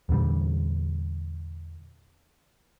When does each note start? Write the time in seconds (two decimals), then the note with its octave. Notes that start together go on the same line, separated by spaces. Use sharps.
0.09 E2 A#2 D3 G3